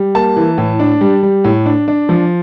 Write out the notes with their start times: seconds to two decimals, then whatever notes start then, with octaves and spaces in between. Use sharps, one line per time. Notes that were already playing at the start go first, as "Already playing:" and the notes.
Already playing: G3
0.15 A#3 A5
0.36 E3
0.58 A2
0.80 D4
1.01 G3
1.23 G3
1.44 A2
1.66 D4
1.88 D4
2.09 F3